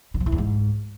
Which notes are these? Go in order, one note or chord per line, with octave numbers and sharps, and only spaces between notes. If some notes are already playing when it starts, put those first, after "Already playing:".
D3
F3
E3
E2
G#2